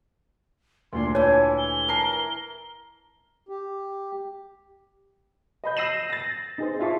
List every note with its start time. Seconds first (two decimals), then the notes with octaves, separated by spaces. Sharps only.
0.93 D2 A#2 D4 C6
1.15 E3 C#5 G#5 A5
1.58 G7
1.88 A#4 A5 C7
3.49 G4
5.64 D#5 B5 G6
5.77 E6 A#6 C7 D#7 E7 F#7
6.10 A6 A#6
6.58 D#4 G#4 C5
6.79 E4 F4 E5 A5 C#6